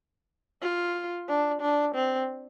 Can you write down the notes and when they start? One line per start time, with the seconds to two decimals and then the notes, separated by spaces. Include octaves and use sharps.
0.62 F4
1.28 D4
1.61 D4
1.95 C4